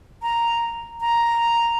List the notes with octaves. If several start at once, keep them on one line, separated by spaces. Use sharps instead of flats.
A#5
A#5